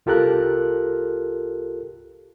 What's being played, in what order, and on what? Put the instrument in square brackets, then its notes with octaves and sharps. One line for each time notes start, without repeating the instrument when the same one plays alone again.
[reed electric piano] C2 F4 G4 A4 A#4 F#6